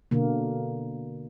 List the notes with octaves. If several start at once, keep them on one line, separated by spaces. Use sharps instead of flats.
B2 D3 A#3